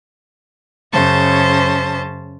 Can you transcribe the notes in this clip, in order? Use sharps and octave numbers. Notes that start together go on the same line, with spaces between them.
F#2 C#3 C#4 C5 A5